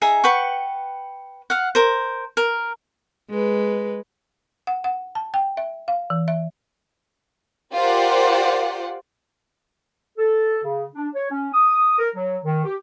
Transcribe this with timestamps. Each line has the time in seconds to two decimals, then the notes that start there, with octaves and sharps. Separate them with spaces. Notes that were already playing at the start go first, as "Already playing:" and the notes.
0.02 D#4 G#4 E5 A#5
0.24 B4 F#5 G5 C#6
1.50 F5 F#5
1.75 A#4 C5
2.37 A#4
3.30 G#3 B4
4.67 F#5
4.84 F#5
5.15 A5
5.34 G5
5.57 E5
5.88 F5
6.10 E3
6.28 E5
7.74 F4 G4 A#4 C5 D5 F#5
10.18 A4
10.64 C#3
10.95 D4
11.15 C#5
11.31 C#4
11.54 D#6
11.98 A#4
12.16 F#3
12.45 D#3
12.65 G4